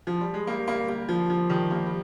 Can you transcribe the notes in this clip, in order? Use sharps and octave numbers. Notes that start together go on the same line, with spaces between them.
F3
G3
G#3
G3 A#3
G3 A#3
G3 A#3
F3
F3
D#3 G3
G3 A#3
G3